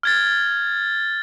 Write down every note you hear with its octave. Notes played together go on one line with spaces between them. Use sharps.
F6 G#6 A6